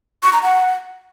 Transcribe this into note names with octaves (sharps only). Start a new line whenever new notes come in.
C#6
A#5
F#5